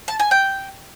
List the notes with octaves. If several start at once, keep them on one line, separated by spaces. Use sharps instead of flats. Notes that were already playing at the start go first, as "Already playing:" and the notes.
A5
G#5
G5